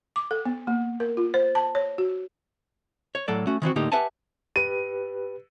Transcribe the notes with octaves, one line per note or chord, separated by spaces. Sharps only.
D6
A4
B3
A#3
A#4
F4
C5
A5
C#5
F#4
C#5
A2 F#3 A4 D5 F#5
A3 C#4 F#4
D#3 E3 C4 F#4
A2 D3 A#3 D#4 G4
G4 B4 E5 F#5 G#5 A5
G4 B4 D#7